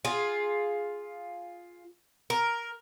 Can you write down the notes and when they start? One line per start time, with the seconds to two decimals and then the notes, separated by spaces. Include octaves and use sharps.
0.05 F4 G#4
2.30 A#4